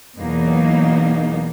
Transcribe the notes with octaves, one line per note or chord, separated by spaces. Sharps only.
E2 B2 F#3 A#3 D#4